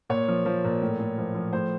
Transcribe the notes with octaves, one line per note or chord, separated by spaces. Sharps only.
A#2 C#5
F3
F3
A#2
A2
A2
F3
F3
A2 C5